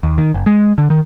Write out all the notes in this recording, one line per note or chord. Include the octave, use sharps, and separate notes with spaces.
D#2
D#3
F#1
G#3
D3
D#3